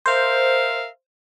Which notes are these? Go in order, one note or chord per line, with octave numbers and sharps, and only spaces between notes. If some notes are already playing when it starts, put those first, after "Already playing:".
A#4 C5 E5 F5